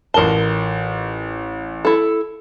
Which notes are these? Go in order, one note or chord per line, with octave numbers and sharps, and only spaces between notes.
A1 F4 A#4 A5 G7
E4 A4